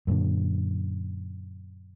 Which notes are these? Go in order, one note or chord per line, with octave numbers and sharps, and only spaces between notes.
F#2 A#2 D3